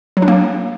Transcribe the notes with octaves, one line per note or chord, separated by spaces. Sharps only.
F#3
D4
A#3